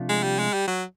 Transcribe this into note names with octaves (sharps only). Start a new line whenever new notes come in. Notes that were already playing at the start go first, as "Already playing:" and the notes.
Already playing: C3 F3 A3 D4 F4
G#3
G3
G#3
G3
F#3